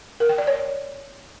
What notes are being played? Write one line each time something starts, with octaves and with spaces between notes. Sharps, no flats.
A#4
G5
D5
C#5